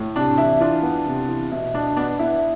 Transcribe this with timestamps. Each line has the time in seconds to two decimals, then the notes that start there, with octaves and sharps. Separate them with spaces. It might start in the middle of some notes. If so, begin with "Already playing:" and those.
Already playing: A2
0.16 C3 D4
0.38 E3 E4
0.60 E3 D4 F4
0.83 B3
1.06 C3
1.28 E3
1.51 B2 E4
1.74 B2 D4
1.97 B3 D4
2.19 B3 E4